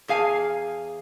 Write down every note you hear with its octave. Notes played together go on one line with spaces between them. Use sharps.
E2 G#4 F5 G#5